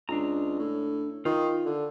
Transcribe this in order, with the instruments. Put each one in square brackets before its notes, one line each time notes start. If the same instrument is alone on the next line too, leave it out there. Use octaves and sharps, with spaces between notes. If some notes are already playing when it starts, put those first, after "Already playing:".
[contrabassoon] C#2 [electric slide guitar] D4 A#5
[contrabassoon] A2
[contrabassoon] D#3 [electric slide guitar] F4
[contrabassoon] D3